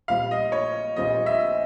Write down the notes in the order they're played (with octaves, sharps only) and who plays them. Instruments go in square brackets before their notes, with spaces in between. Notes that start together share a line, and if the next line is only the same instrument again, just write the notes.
[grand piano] A#1 A#2 G3 C4 F4 [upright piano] F5
[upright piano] D#5
C#5
[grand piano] A#1 A#2 G3 C4 F4 [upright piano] D#5
[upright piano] E5